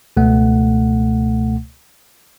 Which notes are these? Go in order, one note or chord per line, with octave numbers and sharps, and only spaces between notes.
C#2 B2 A3 F#5